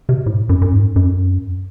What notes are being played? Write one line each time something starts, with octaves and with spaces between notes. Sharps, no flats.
C3
A2
F#2
F#2
G#2
F#2